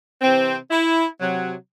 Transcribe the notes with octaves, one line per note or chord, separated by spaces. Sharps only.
C3 E3 C4
E4
C3 F#3